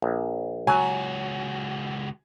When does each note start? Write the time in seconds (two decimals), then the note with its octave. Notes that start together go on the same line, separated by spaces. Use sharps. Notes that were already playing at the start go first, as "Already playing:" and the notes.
0.02 A#1
0.67 C#2 F#3 F#4 G#5